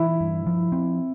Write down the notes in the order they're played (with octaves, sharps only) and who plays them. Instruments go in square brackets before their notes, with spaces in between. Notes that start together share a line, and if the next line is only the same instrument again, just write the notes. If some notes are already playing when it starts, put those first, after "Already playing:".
Already playing: [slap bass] E3 [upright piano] E4
[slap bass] G2
F3
C4